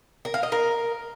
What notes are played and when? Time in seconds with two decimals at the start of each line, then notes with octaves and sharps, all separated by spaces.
0.25 A#4
0.34 F5
0.43 D#5
0.52 A#4